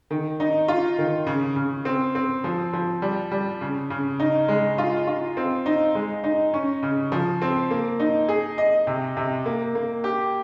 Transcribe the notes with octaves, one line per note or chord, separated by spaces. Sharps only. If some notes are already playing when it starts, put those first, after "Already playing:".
D#3
D#4
F4
D#3
C#3
C#3
C4
C4
F3
F3
G3
G3
C#3
C#3
D#4
G#3
F4
F4
C4
D#4
G#3
D#4
C#4
C#3
F3
C4
A#3
D#4
G#4
D#5
C3
C3
A#3
A#3
G4